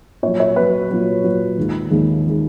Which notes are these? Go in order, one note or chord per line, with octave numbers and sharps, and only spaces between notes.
A#2 F#3 C#5
C#5
A#2 F#3 B4
A#2 F#3
A#2 F#3
D#2 D#3 G#3
D#2 D#3 G#3
D#3 G#3